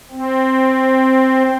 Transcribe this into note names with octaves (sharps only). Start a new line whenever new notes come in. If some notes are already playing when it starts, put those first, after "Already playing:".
C4